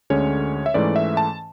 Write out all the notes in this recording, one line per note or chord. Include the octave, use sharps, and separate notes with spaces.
D2 D3 G#3 C#4 C#5
E5
G#2 E3 A3 C#4 D5
E5
A5